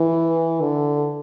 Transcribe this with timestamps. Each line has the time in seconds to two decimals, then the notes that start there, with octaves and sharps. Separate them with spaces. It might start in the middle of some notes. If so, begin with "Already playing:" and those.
Already playing: E3
0.61 D3